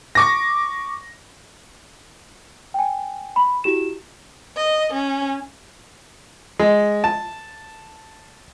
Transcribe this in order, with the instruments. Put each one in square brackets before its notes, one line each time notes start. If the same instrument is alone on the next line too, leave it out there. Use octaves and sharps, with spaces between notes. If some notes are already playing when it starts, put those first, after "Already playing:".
[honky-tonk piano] C#6 D6 A#6
[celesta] G5 G#5
B5
E4 F#4 G4 E7
[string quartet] D#5
C#4
[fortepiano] G#3
A5